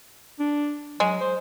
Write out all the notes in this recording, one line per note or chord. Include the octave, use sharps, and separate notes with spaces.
D4
F#3 G#3
C5